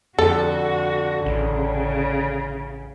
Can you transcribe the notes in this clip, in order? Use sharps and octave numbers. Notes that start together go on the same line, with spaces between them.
F2 D3 F#4 A4
A1 C#3